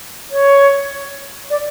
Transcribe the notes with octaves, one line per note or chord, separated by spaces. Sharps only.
C#5
D5